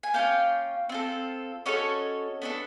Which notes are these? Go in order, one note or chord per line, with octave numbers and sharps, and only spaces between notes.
G#5
A#3 C#4 F4 F5 G5
C4 F4 A4
C#4 F#4 A4 C#5 D#5
B3 D4 F#4 A4